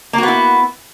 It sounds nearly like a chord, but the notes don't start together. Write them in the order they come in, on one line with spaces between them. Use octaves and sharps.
A#3 F#4 B3 E4